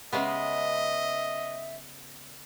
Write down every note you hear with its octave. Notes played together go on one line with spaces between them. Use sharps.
C#3 G#3 B3 D#5 E5